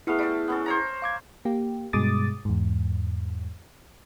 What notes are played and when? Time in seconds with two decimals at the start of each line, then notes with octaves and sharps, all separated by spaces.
0.07 A3 B3 E4 G#4 F5
0.19 G3 A4
0.48 B3 C#4 A4
0.66 C5 C#5 A#5
1.02 F5 D6 G#6
1.45 A#3 G4
1.93 G2 B2 G#3 D6 D#6 A6
2.45 E2 G#2